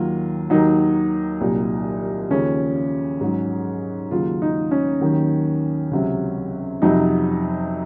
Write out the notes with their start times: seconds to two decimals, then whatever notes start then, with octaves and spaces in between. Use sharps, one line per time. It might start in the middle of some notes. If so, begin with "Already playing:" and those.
Already playing: D#2 D#3 F#3 F4
0.50 D#2 D#3 F#3 D#4
1.40 C2 A#2 F#3
2.30 D#2 C#3 F3 C#4
3.21 G#2 F#3
4.11 D#2 C#3 F#3 F4
4.42 D#4
4.71 C#4
5.01 D#2 D#3 F#3
5.91 C#2 C3 F#3
6.82 F2 C3 F#3 D#4